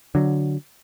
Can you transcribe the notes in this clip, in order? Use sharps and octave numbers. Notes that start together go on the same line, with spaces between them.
D3 F#3